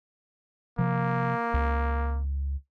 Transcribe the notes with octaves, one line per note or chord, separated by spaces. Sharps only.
C3 F3 A#3
C#2